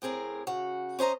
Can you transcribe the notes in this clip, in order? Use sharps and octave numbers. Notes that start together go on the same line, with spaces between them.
A2 C4 G#4 A#4
C#3 F#4
C#4 C5 D#5 A#5